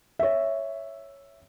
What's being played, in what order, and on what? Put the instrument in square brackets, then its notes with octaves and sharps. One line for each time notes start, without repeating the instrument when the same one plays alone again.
[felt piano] C#5 E5